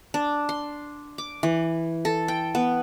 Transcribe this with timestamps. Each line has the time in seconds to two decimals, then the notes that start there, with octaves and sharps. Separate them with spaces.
0.14 D4
0.49 C6
1.18 D6
1.43 E3
2.05 A4
2.28 G5
2.55 B3